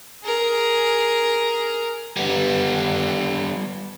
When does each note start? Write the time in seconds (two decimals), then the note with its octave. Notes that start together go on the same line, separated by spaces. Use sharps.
0.23 G#4 A#4
2.17 G3 B3